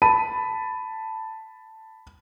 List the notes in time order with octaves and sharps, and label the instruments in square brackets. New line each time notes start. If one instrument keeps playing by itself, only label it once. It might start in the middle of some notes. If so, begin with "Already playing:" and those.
[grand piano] A5 B5 D#7